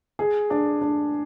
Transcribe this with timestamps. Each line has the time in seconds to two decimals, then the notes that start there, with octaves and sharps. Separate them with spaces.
0.19 G#4
0.50 D4
0.81 D4